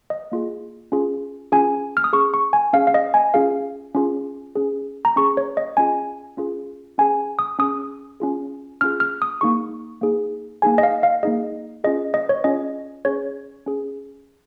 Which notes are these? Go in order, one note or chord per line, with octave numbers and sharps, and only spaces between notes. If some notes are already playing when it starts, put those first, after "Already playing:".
D#5
A#3 F4 G#4
C#4 F4 G#4
C#4 F4 G#4 G#5
F6
D#6
C#4 G#4 C#6
C#6
G#5
C#4 G#4 F5
F5
D#5
G#5
C#4 F4 G#4 F5
C#4 F4 G#4
C#4 G#4
A#5
C#4 G#4 C#6
C#5
D#5
C#4 F4 G#4 G#5
C#4 F4 G#4
C#4 G#4 G#5
D#6
C#4 G#4 D#6
C#4 F4 G#4
C#4 F4 G#4 F6
F6
D#6
A#3 D#4 G#4 C#6
A#3 D#4 G#4
A#3 D#4 G#4 G#5
D#5
F5
F5
A#3 D#4 G#4 D#5
C#4 F4 G#4 D#5
D#5
C#5
C#4 F4 G#4 D#5
C#4 G#4 C#5
C#4 G#4